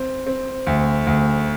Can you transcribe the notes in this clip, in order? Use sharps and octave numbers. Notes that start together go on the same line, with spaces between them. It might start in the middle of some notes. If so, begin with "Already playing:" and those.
Already playing: C4
C4
D2
D2